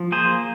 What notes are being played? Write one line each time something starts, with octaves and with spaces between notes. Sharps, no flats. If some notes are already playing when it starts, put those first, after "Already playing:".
Already playing: F3
A#3 G#4 C5